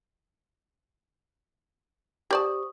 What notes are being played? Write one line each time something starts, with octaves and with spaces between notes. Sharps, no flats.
G4 C5 D5 A5 C#6 D#6